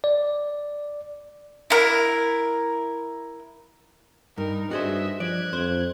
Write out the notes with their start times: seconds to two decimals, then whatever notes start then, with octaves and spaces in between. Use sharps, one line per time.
0.04 D5
1.70 E4 A#4
4.38 G2 D#4 A#4
4.71 G2 F#4 G#4 C5 D#5 E5
5.20 F3 D5 F#6 G#6
5.53 F2 C5